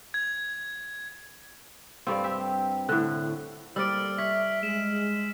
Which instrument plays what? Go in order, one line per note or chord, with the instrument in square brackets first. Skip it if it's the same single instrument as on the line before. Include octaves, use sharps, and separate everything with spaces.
[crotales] G#6
[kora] G2 C4 [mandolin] F4 A4 D5
[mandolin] G4 [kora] E5
[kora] A2 D3 [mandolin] F#6
[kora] G3 D5 [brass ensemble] A#3 A4 C5 [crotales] E6 F6 D7
[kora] C#5 [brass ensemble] E5 [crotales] B6
[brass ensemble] G#3 [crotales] E7